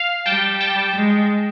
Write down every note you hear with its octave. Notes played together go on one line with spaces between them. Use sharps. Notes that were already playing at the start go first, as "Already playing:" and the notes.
Already playing: F5
G3 G5 A5
G5 A5
G#3